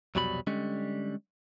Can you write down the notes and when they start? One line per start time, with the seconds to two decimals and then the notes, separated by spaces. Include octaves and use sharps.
0.15 C2 F2 B2 F#3 G3 B5
0.47 D3 G3 G#3 C#4